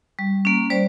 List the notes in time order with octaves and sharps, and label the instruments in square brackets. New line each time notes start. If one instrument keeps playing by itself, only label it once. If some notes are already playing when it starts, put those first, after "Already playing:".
[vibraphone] G3
A#3 C#4
G3 C5 D5